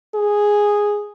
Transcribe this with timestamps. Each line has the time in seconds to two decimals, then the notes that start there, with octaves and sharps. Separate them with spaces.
0.15 G#4